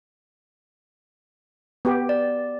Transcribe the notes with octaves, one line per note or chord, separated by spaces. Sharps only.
B3 G4
D5